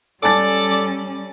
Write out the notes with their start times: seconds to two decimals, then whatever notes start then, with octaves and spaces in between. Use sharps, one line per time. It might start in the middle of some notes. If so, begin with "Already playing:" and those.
0.23 G3 C#4 A4 D5 G#5 A5 A6